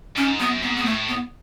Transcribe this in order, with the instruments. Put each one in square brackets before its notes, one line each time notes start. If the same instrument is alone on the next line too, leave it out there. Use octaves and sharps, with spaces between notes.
[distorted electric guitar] G#2 [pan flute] C#4
[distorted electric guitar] F#2 [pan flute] B3
[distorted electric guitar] G#2 [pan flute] B3
[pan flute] B3
[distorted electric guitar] A2 [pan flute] A3
[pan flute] B3